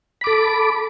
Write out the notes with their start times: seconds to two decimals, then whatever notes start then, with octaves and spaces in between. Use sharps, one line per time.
0.21 B5
0.24 D6
0.27 A4